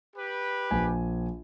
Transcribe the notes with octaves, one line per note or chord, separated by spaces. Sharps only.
G4 B4
A#1 G#5